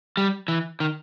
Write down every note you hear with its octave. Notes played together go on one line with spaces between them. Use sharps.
G3
E3
D#3